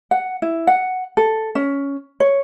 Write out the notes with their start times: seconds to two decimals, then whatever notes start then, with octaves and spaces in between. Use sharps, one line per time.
0.11 F#5
0.42 E4
0.67 F#5
1.17 A4
1.55 C#4
2.20 C#5